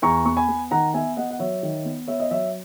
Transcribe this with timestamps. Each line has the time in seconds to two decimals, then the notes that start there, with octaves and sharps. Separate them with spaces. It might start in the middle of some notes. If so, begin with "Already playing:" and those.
0.02 E2 A#5 C#6
0.25 B3 C#6
0.37 G#5 B5
0.48 B3
0.71 D#3 F#5 A#5
0.94 B3 E5 G#5
1.17 B3 D#5 F#5
1.30 F#5
1.39 F#3 C#5 E5
1.63 D#3
1.85 B3
2.08 B3 C#5 E5
2.20 D#5
2.31 F#3 C#5 E5